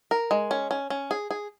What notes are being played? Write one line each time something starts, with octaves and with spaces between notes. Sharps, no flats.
A#4
G#3
C#4
C#4
C#4
G#4
G#4